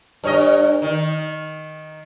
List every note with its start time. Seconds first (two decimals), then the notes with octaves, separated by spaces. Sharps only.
0.24 G2 C#5 D#5
0.82 D#3